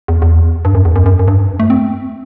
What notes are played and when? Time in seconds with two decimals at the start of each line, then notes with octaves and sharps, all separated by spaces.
0.08 E2
0.22 E2
0.65 G2
0.75 F#2
0.85 E2
0.96 F#2
1.06 F#2
1.19 F#2
1.28 G2
1.60 A3
1.70 C4